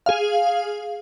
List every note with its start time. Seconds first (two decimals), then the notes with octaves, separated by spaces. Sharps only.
0.06 G#4 F5